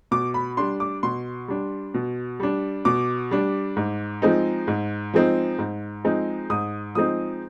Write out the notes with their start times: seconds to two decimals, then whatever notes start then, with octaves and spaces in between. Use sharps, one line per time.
0.11 B2 D6
0.34 B5
0.57 G3 D4 C6
0.80 D6
1.03 B2 C6
1.48 G3 D4
1.94 B2
2.40 G3 D4
2.85 B2 D6
3.31 G3 D4
3.77 G#2
4.22 F3 G#3 C4 D#4
4.68 G#2
5.14 F3 G#3 C4 D#4
5.59 G#2
6.04 F3 G#3 C4 D#4
6.50 G#2 D#6
6.95 F3 G#3 C4 D#4 D#6